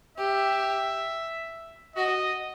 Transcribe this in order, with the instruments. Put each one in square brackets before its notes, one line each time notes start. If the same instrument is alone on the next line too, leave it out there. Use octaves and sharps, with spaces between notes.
[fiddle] G4 [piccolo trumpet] E5
[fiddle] F#4 [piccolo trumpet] D#5